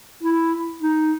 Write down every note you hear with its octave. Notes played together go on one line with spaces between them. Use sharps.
E4
D#4